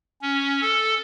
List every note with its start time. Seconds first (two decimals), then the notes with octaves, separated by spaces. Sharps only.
0.22 C#4
0.62 A4